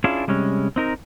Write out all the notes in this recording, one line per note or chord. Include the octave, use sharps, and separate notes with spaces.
C#4 D4 E4 F4 G#4
C3 G3 G#3 C#4
C4 D#4 A#4